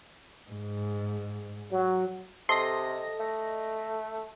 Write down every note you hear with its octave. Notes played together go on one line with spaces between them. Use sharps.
G#2
F#3
C3 A4 D#5 C6 A#6
A3